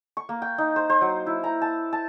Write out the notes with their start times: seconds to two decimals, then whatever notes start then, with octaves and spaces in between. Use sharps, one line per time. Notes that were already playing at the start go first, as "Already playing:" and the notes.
0.17 C#6
0.29 A#3
0.42 G5
0.58 D#4
0.76 C5
0.90 C5
1.01 F#3
1.27 E4
1.44 A#5
1.62 A5
1.93 A5